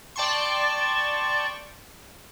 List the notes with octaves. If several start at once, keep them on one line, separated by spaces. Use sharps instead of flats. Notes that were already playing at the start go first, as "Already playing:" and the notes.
D5 G5 A5 C6 C#6